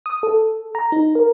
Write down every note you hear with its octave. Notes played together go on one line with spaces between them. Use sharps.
D#6
A4
A#5
D#4
A#4